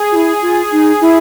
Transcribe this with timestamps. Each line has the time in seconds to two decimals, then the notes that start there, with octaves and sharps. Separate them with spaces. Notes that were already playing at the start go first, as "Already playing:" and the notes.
Already playing: G#4
0.12 F4
0.15 E4
0.42 F4
0.71 D#4
1.01 E4